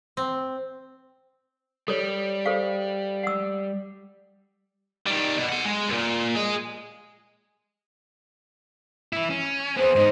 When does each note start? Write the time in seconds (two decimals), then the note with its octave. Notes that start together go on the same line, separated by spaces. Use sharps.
0.17 C4
1.88 G3 A4 C#5
2.46 A4 C5 F5
3.23 F#5 E6
5.07 D#3 G3
5.37 B2
5.49 F#5 C6
5.65 G#3
5.88 D#2 A#2
6.36 G#4 D#5
9.13 E3 E4
9.30 C#4
9.77 B3 G#4 C5
9.96 G#2 D#4